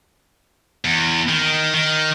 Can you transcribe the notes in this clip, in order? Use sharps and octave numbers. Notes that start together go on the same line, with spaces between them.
E2
D#3
D#3